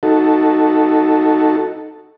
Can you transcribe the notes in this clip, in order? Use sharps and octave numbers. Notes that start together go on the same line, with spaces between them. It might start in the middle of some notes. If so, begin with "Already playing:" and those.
D#4 F#4 A4